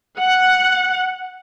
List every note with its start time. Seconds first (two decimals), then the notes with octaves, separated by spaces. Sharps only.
0.19 F#5